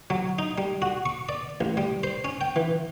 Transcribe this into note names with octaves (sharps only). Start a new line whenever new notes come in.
F#3
D#4
G3
F#4
C#6
D5
A1
G3
C5
C#4
G5
E3